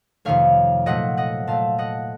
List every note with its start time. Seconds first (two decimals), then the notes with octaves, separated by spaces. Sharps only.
0.25 F2 C3 D#3 A3 C#5 F5
0.86 A#2 F#3 A3 D#5 F#5
1.17 D#5 F#5
1.47 A#2 A3 F5 A5
1.78 D#5 F#5